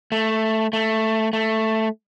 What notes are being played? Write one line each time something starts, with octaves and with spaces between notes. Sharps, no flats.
A3
A3
A3